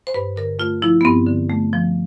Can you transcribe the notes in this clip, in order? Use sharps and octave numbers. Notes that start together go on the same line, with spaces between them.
C5
G2 B4
D3 A#4
A3 F4
F3 E4
B3
G2 C4
D3
A3
F3